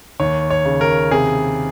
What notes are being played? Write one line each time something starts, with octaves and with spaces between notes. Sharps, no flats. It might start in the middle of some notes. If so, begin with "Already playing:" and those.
D#2 C#5
C#5
C#3
A#4
C3 G#4